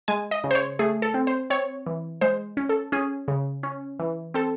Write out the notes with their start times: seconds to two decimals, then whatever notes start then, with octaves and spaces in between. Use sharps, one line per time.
0.08 G#3 G#5
0.31 D#5
0.44 C#3
0.51 C5
0.55 C#5
0.79 A3 G#4
1.02 A4
1.14 C4
1.27 C5
1.50 C4 C#5
1.86 E3
2.21 G#3 C5
2.57 C#4
2.69 A4
2.92 C#4 G#4
3.28 C#3
3.63 C#4
3.99 E3
4.34 C4 A4